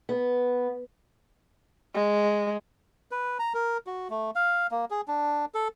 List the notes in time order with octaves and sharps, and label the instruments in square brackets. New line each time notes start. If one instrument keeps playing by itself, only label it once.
[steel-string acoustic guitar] B3
[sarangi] G#3
[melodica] B4
A#5
A#4
F#4
A3
F5
A#3
G#4
D4
A4